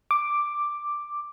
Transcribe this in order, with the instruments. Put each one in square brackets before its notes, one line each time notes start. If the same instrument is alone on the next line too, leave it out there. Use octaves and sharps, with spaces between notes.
[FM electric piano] D6